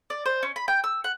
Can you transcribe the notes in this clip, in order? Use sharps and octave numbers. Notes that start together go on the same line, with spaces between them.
D5
C5
C#4
B5
G5
E6
F#5